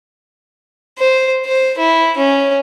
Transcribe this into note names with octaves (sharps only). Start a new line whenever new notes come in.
C5
C5
E4
C#4